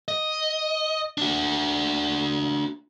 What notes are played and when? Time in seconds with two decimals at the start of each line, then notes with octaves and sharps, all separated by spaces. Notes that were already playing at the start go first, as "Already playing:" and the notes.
0.08 D#5
1.18 D4 F#4